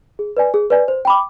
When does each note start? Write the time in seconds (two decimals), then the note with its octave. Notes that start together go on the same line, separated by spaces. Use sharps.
0.19 G#4
0.37 B4 D5 G#5
0.54 G#4
0.70 B4 D5 G#5
0.88 C5
1.05 G5 B5 D6